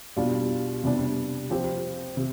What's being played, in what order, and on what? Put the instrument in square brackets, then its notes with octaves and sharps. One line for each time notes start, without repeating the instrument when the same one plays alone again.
[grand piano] B2 G3 D4 F4
C3 G3 B3 D4
F3 C4 G4
C3